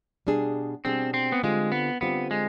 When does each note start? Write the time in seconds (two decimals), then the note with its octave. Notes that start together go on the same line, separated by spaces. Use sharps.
0.27 B2 G3 D4 G#4
0.85 B2 G3 C4 D4 G#4
1.14 C4
1.32 B3
1.43 D3 G3 G#3 C4 F4
1.72 B3
2.01 D3 G3 B3 C4 F4
2.31 G#3